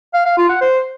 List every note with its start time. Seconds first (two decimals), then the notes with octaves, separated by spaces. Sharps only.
0.14 F5
0.26 F5
0.37 F4
0.49 F#5
0.61 C5